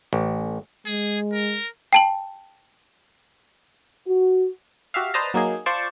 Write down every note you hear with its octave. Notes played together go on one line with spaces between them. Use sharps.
A1
G#3 G#4
A#4
G5 A5 F#7
F#4
F#4 G4 E5 F5
B4 C5 D5 D#5 A5 A#5
F#3 A#3 D#4 G#4
F4 C5 D5 A5 C#6 C#7